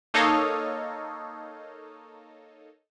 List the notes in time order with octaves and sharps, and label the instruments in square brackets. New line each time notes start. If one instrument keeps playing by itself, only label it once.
[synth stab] A#3 D#4 A4 C#5 D#5 F5